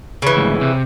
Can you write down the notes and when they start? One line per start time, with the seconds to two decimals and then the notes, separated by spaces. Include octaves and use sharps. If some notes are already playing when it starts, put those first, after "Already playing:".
0.22 C#3 E3
0.37 D2 G#2
0.62 C3